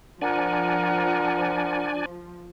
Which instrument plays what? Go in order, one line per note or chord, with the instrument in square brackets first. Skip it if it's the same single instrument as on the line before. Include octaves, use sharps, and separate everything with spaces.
[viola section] F3 [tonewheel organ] D4 D5 G#5 [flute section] A#4 F#5